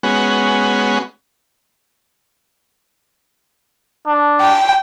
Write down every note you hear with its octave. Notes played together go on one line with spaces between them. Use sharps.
G#3 B3 C#4 F#4
D4
G5